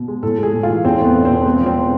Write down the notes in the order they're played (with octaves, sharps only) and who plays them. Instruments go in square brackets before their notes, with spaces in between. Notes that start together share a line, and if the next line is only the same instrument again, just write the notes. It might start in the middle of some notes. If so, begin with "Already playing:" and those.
Already playing: [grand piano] B2
G#3
A2 A4
G#3 G#4
A2
F4
E3
E2 C4
A3 B3
E2
B2 C4
G#3 B3
F3
C4